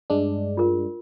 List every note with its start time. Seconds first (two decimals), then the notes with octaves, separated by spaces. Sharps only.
0.10 G2 G#3 D4
0.57 F4 A#4